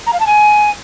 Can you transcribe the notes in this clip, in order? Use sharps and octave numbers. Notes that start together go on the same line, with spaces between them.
A#5
F5
A5
G#5